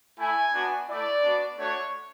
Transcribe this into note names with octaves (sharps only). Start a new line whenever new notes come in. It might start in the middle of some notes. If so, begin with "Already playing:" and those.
A3 E4 G#5
B3 D4 F#4
A3 E4 D5
B3 D4 F#4
A3 D4 F#4 C#5